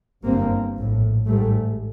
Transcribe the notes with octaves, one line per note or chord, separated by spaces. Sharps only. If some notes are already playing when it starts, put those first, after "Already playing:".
G1 G2 A#3 C4
A#1 A2
A1 G#2 G3 A3